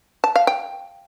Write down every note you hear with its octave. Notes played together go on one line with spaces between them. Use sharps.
A5
F5
G5